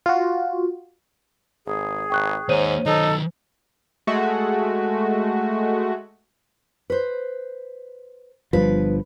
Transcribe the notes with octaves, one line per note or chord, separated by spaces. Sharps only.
F4 F#4
G#1 G#4
G#1 G5 C#6 F#6
D#2 G#2 D#4 C5 C#5 D#7
D#3 F#3 D#4 A4
G#3 A3 F#4
B4 C5
G1 G2 F3 B4